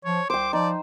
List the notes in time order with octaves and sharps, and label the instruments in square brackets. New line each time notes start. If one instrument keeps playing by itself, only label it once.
[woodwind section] F3 [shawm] C#5
[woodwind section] C2 C6 [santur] C5 G5 [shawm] D6
[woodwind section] F3 [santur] D#4 [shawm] D5